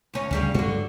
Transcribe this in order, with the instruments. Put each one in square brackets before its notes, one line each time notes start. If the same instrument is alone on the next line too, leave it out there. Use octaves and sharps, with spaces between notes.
[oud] D2 C#4
[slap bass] D2 [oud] C#3 G3 C#4
[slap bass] G2 F#3 A3 [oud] D3 F#4